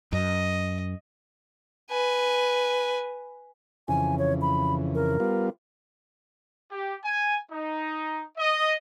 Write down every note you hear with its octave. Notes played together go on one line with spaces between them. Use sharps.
F#2 D#5
B4 G#5
F2 C#3 E3 G#5
C#5
B5
A#4
G3 B3 F4
G4
G#5
D#4
D#5